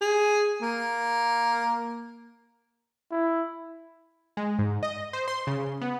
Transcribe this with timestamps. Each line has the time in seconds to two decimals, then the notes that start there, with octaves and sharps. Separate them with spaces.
0.01 G#4
0.62 A#3
3.11 E4
4.37 G#3
4.59 G#2
4.83 D#5
5.13 C5
5.28 C6
5.47 C#3
5.81 B3